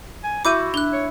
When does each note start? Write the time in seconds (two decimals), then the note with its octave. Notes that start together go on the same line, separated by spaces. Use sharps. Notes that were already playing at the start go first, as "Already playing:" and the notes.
0.24 G#5
0.45 E4 F#4 D6 G6 D#7
0.74 D4 F#6 G7
0.93 C#5